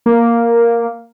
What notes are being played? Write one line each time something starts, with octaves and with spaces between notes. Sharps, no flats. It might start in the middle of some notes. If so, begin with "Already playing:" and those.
A#3